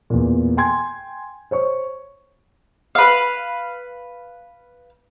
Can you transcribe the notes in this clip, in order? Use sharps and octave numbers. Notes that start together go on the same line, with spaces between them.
E2 A#2
G5 G#5 C6 G#6
C5 C#5 C#6
B4 F5